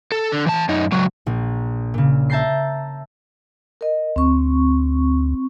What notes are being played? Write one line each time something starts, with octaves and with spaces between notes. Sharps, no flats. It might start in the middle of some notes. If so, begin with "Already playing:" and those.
A4
D3
E3 A5
F#2 D#4
C#2 F#3
A#1
A#2 C#3
E5 A5 A#5 G6 C7
A#4 D#5
D2 C4 C#6